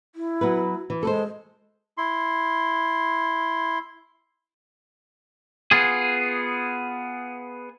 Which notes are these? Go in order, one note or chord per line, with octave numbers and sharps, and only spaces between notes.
E4
F#3 B3 B4
E3
G#3 A4 B4 C5
E4 C6
B3 F4 G#4